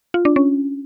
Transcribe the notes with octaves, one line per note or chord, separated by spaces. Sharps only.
F4
D4
C#4